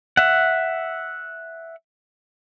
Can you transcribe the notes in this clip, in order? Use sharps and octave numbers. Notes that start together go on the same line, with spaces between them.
E5 F#5